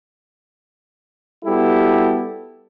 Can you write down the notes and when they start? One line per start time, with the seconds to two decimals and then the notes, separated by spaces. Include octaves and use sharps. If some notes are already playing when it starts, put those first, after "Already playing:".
1.45 G3 B3 E4 F#4 G4 A4